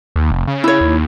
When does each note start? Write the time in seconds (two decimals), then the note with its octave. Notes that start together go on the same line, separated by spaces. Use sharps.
0.16 D#2
0.31 F1
0.47 C#3
0.64 E4 C#5
0.81 D#2